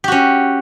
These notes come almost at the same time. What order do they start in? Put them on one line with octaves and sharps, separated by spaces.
G4 F#4 C#4